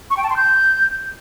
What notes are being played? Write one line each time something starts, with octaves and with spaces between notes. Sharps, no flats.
C#6
G5
A5
C6
G6